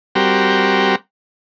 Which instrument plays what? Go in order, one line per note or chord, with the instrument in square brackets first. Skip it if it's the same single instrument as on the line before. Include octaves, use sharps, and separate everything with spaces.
[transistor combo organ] G3 C4 F#4 G4 A#4